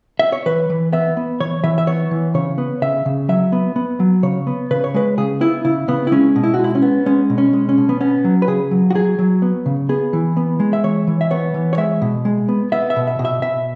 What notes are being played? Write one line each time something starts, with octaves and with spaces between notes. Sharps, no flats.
E5
C#5
E3 B4
E3
B3 E5
B3
E3 C#5
E3 E5
E5
B3 C#5
E3
C#3 C#5
B3
C#3 E5
C#3
F#3 E5
B3
B3
F#3
C#3 C#5
B3
C#3 B4
C#5
G#3 B4
C#3 G#4
B3 E4
C#3 E4
C#3 B3
E4
G#3 C#4
B2
E4
F#4
G#3
E4
C#4
B3
G#3 C#4
B2
C#4
G#3
C#4
B2
B3
B3 C#4
F#3
B4
C#3 G#4
F#3
F#4
F#3 G#4
F#3
B3
C#3
B3 G#4
E3
B3
G#3
E5
E3 C#5
E3
E5
B3 C#5
E3
C#5
G#3 E5
B2
G#3
B3
B3 E5
E5
B2
E5
B2
E5
B2 E5